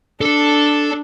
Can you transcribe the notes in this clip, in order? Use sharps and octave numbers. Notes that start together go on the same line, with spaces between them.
D4 A4 A5